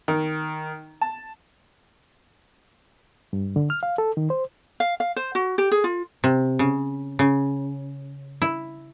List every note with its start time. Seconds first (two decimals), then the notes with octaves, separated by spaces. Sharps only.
0.08 D#3
1.01 A5
3.33 G2
3.56 D3
3.70 F6
3.83 F5
3.98 A4
4.17 D#3
4.30 C5
4.80 F5
5.00 F5
5.16 C5
5.35 F#4
5.58 G4
5.71 G#4
5.84 F4
6.24 C3
6.59 C#3
7.19 C#3
8.42 E4